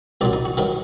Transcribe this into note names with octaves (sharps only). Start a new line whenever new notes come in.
C2 A#2 F#3 D5
D#4
F#4
G2 D#3 F#3